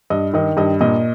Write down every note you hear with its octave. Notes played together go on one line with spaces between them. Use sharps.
G2 D#5
D#3 D#5
G2 D#5
A#2 D#5